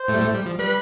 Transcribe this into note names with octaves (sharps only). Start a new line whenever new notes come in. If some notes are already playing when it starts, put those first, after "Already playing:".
Already playing: C5
A2 A3
G3
A2 A3
G3
F3
G3 B4